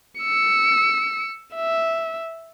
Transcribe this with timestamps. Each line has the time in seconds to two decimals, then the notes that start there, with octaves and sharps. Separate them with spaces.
0.21 E6 C#7
1.55 E5